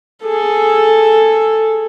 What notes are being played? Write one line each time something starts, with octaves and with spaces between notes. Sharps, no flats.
G#4 A4